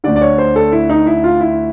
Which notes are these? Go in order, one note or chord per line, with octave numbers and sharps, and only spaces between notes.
D2 D3 D5
D5
C#5
C5
A4
E4
D#4
E4
F4
E4